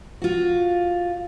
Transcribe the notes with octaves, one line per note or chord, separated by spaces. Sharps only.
F4 F#4